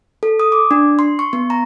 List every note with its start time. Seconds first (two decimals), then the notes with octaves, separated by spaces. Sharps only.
0.23 A4
0.40 D#6
0.52 D6
0.71 D4
0.99 C6
1.19 C#6
1.33 B3
1.50 A#5